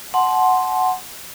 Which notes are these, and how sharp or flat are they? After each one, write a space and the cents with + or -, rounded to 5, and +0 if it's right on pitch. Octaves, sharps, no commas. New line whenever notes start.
F#5 +0 A5 -40 C6 +0